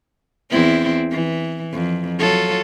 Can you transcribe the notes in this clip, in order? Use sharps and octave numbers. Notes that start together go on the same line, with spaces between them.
E2 C4 E4
E3
F2
F#3 F4 A4